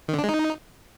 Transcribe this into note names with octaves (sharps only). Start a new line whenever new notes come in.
D#3
D3
D4
G#3
D#4